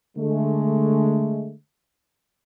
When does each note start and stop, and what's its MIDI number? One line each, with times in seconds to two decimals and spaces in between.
0.17 1.53 50
0.17 1.53 56
0.17 1.53 57